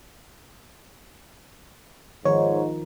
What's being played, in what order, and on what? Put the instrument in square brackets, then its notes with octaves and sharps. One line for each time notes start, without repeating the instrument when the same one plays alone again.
[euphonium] G#2 [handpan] D#3 F3 D#4 [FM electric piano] C#5